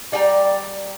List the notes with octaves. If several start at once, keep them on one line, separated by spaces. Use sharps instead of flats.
G3 D5 G5 G#5 A#5